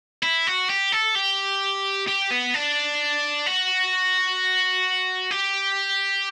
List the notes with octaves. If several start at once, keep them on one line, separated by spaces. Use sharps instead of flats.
E4
F#4
G4
A4
G4
G4
B3
D4
F#4
G4